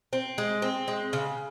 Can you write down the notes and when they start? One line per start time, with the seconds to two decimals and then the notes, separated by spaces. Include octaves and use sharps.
0.13 C4
0.38 G#3
0.62 C4
0.88 G#3
1.13 C#3